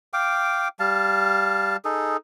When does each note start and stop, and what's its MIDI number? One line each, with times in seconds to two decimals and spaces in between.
0.13 0.68 77
0.13 0.68 79
0.13 0.68 86
0.79 1.76 55
0.79 1.76 77
0.79 1.76 81
1.85 2.17 63
1.85 2.17 68
1.85 2.17 69